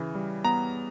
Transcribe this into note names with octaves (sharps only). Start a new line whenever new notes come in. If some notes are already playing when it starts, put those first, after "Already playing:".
Already playing: C#3 E3
G3
B3 A#5